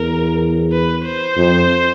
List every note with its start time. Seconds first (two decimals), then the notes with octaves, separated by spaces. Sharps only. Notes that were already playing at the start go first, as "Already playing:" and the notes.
Already playing: E2 A#4
0.72 B4
1.05 C5
1.37 F2